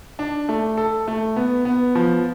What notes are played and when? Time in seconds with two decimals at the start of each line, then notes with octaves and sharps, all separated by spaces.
0.19 D4
0.49 A3
0.77 A4
1.08 A3
1.36 B3
1.65 B3
1.95 F3